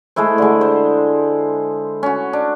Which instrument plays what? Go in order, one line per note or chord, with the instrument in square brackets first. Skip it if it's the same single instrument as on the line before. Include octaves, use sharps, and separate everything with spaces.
[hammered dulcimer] G#3 A3 E4 C5
D3 G#3
C5
C#4 F#4
D4